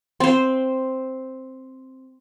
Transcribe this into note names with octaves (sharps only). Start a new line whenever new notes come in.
C4 C5